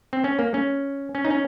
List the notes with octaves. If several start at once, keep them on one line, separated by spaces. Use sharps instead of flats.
C4
C#4
A#3
C#4
C#4
D#4
C#4